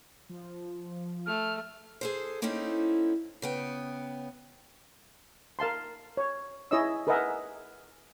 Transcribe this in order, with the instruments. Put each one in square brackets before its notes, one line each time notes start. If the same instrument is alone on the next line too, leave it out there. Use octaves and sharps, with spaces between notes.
[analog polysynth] F3
[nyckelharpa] A3 [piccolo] F6
[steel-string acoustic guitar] G#4 A4 C5
A#3 C4 C#4 D#4 E4 A4
C#3 B3 G5
[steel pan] A#4 F5 A5 C6
C#5
E4 G#4 C#5 D#5 E5 E6
G#4 A#4 B4 D#5 E5 F#5